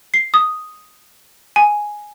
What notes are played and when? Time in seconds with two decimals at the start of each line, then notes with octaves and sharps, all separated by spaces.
0.14 C7
0.34 D#6
1.56 G#5